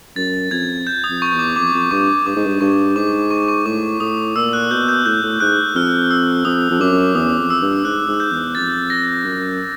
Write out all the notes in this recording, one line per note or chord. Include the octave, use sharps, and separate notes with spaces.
F#2 A6
F2 G#6
G6
D#6
F2
C#6
E2
D6
F2 D6
F2
G2 C#6
G2 D6
G#2
G2
G2 C#6
G#2 D6
C#6
C#6
A2 D6
A2 D#6
A#2 E6
F#6
B2 G6
G6
A2 G6
A2
G#2 F#6
F2 F6
E6
F2 D#6
F2
F#2 D6
E2 D#6
F2
E6
G2
G#2 F#6
G#2
G6
E2
F2 A6
A#6
F#2